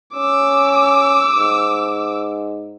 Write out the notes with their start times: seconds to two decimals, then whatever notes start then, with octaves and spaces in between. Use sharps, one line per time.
0.15 C#4 D6 E6
1.36 G#2